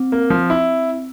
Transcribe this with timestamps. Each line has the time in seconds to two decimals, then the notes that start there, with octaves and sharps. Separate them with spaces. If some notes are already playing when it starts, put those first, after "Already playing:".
Already playing: C4
0.12 A#3
0.30 F3
0.50 E4